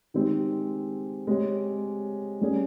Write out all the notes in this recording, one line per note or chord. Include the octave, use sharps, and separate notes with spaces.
D#3 G#3 C4 G4
G#3 C4 G4 C#5
G3 C#4 G#4